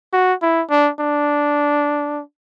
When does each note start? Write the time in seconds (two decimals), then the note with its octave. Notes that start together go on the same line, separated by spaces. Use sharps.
0.13 F#4
0.42 E4
0.70 D4
1.00 D4